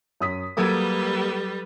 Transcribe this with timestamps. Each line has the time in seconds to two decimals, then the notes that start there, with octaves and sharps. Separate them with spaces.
0.21 F#2 D#6 B6
0.57 F#3 G3 A#3 A4 B4 D#6 E6 G#6